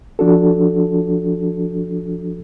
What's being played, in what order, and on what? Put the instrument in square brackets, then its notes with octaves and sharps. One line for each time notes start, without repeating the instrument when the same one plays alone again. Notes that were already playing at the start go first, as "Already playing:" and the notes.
[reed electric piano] F3 D4 F#4 A4